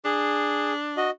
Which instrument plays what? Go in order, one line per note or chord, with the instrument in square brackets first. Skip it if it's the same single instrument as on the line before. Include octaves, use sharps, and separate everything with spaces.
[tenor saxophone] D4 [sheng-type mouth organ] G#4
[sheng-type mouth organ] F#4 D#5